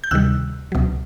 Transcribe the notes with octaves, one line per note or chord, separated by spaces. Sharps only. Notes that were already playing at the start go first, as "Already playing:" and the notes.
G6
D2 C3 D#3 G3 E6 F#6
C#2 B2 F#3